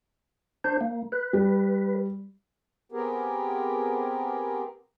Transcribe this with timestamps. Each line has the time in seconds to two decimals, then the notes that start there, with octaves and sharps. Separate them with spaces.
0.64 D4 C5
0.81 A#3
1.12 B4
1.33 G3
2.92 B3 C4 G4 G#4 A#4